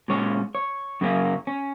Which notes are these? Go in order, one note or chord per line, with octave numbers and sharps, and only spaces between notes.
A#2 G#3 C#4 C#5
C#5
F#2 C#3 A#3 C#4
C#4